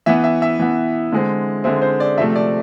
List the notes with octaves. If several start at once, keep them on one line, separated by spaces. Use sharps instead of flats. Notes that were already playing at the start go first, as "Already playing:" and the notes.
E3 B3 E5
E5
E5
E3 B3
D3 G#3 C4
D3 G#3 C4 E5
C5
D5
C3 F3 A3 E5
D5